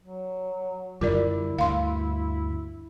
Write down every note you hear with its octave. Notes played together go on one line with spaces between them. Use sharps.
F#3
F#2 D3 G3 E4 F4 A#4 D5
D2 G2 F5 C6